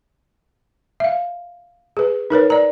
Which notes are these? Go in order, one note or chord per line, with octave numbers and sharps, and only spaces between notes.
E5 F5
G#4 B4
D#4 A#4 B4 C#5
D5 A#5